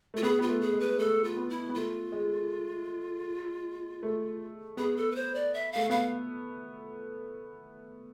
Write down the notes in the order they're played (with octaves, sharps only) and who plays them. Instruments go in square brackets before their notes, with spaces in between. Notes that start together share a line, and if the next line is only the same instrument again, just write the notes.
[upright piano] A3 [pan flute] F4
[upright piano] B3 [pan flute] G#4
[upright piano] B3 [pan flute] F4
[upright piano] A3
[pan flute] G#4
[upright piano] G#3
[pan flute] B4
[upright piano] A3 [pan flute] A4
[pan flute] F4
[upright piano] B3
[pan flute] E4
[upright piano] B3
[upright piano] A3 [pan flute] F4
[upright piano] G#3
A3
[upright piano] B3 [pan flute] G#4
[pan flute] A4
B4
C5
D5
E5
[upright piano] A3 [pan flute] F5
[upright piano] B3 [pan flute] F5